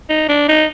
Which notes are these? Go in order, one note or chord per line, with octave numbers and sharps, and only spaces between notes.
D#4
D4
D#4